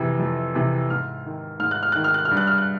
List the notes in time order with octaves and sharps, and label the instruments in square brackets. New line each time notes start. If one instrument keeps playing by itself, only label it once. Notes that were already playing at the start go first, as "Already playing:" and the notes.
Already playing: [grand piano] F2 C3 E3
F2
C3 E3
G#2 F6
D#3
G#2 F6
F#6
F6
D#3 F#6
F6
F#6
F6
G2
F#6
F6
F#6